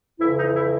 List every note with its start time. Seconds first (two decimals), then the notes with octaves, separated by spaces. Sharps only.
0.19 F2 C#3 E3 E4
0.37 D#4
0.54 E4